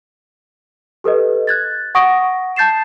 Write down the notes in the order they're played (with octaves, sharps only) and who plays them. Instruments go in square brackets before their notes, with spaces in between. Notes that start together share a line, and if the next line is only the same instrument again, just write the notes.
[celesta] G4 A4 B4 D#5
F#6 G#6 A6
F#5 C#6 D#6 A#6 D7
A5 G6 A6 C7 E7